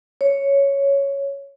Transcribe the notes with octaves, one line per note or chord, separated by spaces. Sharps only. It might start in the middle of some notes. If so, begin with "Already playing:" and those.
C#5